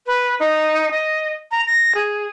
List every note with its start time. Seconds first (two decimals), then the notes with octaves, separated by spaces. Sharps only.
0.07 B4
0.40 D#4
0.91 D#5
1.51 A#5
1.67 A#6
1.95 G#4